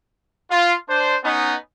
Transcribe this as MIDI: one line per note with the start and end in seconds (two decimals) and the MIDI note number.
0.50 0.74 65
0.89 1.15 62
0.89 1.15 72
1.24 1.56 59
1.24 1.56 61
1.24 1.56 63